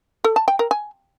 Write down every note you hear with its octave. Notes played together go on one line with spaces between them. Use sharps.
A4
A5
G5
A#4
G#5